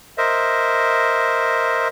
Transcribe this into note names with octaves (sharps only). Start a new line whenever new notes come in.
A#4 C5 D#5 E5